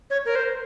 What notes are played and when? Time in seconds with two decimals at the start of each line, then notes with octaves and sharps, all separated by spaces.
0.10 C#5
0.25 A#4
0.35 C5